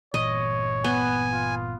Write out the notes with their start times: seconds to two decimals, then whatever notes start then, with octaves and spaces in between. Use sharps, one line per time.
0.14 G1 A#2 E3 C#5 D#5
0.84 B3 G#5
1.32 F4